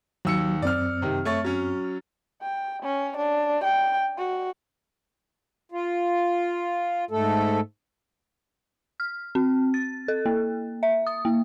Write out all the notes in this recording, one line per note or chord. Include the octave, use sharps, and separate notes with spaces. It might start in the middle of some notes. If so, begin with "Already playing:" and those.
D#2 F#3 E6 C#7
F#2 C4 D5 F6
C3 D#3
A3 C#5 A6
F#3 C#4
G5
C#4
D4
G5
F#4
F4
G#2 A3 A4
F6
C4
A6
A4
A#3
E5
D#6
A#3